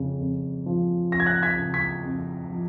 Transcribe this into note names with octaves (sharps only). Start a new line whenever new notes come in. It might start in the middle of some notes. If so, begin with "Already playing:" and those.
Already playing: F2 C#3
F2
F3
F2 A#6
G#6
F#6 A#6
G#6 B6
C#3
G#6 B6
F2
F3